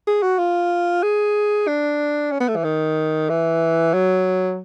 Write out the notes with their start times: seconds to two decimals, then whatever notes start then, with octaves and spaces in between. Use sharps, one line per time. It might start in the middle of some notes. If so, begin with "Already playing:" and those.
0.07 G#4
0.23 F#4
0.39 F4
1.03 G#4
1.68 D4
2.32 C#4
2.40 B3
2.48 A3
2.56 E3
2.64 D#3
3.29 E3
3.93 F#3